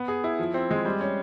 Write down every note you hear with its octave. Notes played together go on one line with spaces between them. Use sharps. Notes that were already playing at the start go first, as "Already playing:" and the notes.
Already playing: B3
G#4
E4
F3
C4
G#3
G3
C#4